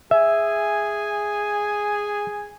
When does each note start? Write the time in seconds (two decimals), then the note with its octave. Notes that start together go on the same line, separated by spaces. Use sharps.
0.11 G#4 E5 G#5